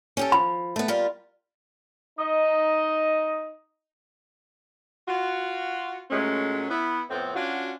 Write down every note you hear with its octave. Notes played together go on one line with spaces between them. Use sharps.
C#4 G4 A4
F3 B5
A3 B3
G3 F4 A#4
D#4 D#5
F4 F#4
A#2 F#3 G#3 A3 C#4
B3 E4
F2 A2 B3 C4
C#4 D4 F4 F#4